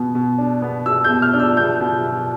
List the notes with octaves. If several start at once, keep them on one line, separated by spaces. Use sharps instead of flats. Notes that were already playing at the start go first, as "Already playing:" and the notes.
Already playing: B2 B3
B2
D4
B3
B2 E6
G6
B2
F6
D4
E6
B3 G6
B2
B2